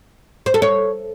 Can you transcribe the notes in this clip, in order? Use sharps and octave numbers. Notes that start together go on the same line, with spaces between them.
C5
A4
C#5